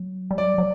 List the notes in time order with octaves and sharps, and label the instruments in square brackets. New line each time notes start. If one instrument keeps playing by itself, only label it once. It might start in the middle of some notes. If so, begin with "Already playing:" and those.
Already playing: [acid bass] F#3
G3
[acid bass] F#3 [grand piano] D5
[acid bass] F#3